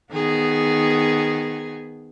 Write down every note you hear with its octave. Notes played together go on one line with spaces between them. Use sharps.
D#3 B3 G#4